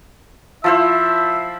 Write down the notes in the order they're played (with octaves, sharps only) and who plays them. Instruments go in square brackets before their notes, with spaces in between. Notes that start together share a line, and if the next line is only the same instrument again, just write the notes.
[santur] F3 E4 C5 [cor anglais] E5